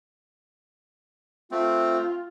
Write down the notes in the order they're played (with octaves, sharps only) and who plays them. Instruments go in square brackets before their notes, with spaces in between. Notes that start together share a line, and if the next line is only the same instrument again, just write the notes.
[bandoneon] A3 C4 [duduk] F4